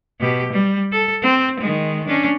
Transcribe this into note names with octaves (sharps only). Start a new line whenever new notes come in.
B2 G4
G3
A4
C4
D#3 G#3
C#4 D4